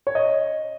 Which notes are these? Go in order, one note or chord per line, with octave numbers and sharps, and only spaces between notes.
C#5
D#5